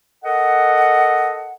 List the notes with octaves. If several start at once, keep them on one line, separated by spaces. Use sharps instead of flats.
A4 A#4 D#5 F#5